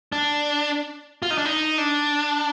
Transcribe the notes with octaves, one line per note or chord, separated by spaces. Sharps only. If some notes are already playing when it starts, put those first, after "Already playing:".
D4
F4
D#4
D4
D#4
D4